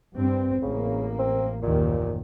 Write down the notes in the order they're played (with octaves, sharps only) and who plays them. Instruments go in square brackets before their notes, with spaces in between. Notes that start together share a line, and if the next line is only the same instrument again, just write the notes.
[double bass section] G2 C4
[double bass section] A1 A#3 [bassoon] C#3
[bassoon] C4
[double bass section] F#1 D#2 D#3 [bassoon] A#2